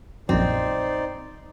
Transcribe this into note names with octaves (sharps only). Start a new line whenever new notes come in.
A#1 F#2 C4 D#4 C5 D5